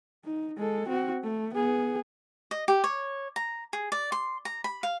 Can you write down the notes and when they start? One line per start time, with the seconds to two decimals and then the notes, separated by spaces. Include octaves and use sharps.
0.25 D#4
0.57 G#3 A4
0.88 C4 F#4
1.23 A3
1.54 B3 G#4
2.51 D#5
2.68 G4
2.84 C#5
3.36 A#5
3.73 G#4
3.92 D5
4.12 C6
4.45 A#5
4.64 B5
4.83 F5